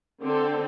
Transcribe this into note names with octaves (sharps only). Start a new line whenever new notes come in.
D3 C4 A4